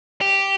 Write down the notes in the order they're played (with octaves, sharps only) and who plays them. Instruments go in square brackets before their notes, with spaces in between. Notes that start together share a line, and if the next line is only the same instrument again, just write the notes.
[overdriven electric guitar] G4